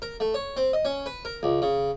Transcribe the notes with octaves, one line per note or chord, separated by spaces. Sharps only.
A#4
A3
C#5
C4
D#5
C#4
B4
A#4
C#2
C#3